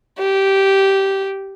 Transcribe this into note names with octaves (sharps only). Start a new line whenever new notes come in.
G4